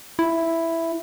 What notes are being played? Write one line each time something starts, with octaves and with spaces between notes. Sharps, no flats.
E4